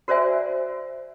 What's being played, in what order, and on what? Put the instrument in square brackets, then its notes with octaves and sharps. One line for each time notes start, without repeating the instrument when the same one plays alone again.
[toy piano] F#4 A#4 C5 D5 E5 G#5